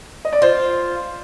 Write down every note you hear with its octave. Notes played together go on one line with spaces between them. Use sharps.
D#5
D5
F4 C5